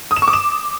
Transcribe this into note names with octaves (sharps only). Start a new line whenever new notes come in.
D#6
E7
C#6
D6
E7